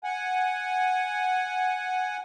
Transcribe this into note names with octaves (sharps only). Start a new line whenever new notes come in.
F#5 G#5